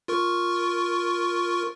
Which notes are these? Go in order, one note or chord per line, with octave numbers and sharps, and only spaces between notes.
F4 A#4 C#6